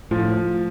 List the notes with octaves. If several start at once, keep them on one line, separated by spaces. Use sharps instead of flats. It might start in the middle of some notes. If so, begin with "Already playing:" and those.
A2 F3